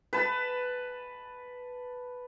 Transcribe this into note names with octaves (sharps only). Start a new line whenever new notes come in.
B4 A5